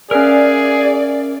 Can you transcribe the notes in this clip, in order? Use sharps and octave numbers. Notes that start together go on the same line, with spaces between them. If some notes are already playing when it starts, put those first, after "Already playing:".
C#4 G#4 A#4 D5 E5 F5 F6